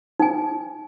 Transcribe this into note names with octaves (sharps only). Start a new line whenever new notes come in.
D#4 G#5